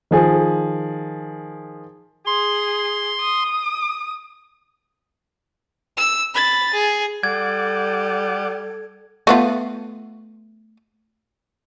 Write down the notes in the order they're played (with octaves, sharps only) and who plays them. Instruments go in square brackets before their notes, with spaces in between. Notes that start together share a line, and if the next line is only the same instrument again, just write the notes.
[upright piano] D#3 F3 G#4
[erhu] G#4 [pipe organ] C6
[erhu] D#6
[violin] E6
B5 A6
G#4
[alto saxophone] G3 [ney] A4 [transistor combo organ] F#5 D6 [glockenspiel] G#6
[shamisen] A3 B3 F4